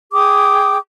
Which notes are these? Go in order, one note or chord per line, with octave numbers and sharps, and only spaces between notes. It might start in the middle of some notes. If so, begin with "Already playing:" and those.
G#4 G5 D6 D#6